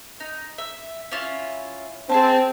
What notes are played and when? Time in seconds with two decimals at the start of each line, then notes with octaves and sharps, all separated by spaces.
0.20 D#4
0.58 E5
1.12 C#4 E4 F4
2.10 C4 G#4 E5 A5